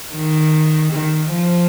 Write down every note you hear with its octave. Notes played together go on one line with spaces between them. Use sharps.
D#3
D#3
F3